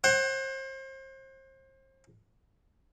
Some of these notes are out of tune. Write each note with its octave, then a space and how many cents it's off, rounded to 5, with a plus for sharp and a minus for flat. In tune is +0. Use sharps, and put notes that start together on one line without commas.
C5 +35 F#5 +25